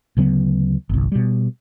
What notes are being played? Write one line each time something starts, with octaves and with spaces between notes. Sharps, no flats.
D2 C#3 F#3 B3
G1 C2
B2 G3